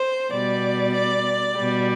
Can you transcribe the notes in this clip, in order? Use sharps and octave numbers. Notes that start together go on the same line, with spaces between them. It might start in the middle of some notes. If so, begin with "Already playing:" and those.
Already playing: C5
B2 G3 D5
D5
B2 G3